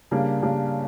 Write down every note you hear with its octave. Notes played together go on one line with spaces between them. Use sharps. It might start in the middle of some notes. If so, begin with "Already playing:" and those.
C#3 G3 A#3 D4
C#3 G3 A#3 D4